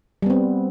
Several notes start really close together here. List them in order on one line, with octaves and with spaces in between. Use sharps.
G3 B3 C4